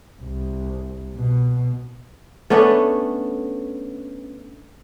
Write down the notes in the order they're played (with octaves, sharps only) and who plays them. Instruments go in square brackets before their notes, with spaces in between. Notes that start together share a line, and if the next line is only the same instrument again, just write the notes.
[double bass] C2
B2
[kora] A3 B3 C#4 D4